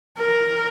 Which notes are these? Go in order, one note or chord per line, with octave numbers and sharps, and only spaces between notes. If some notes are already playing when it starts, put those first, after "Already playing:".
A#4